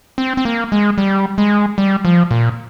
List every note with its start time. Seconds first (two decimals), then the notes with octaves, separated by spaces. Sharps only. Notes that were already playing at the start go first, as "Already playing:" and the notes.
0.18 C4
0.37 C4
0.45 A#3
0.72 G#3
0.98 G3
1.38 G#3
1.78 G3
2.05 F3
2.31 A#2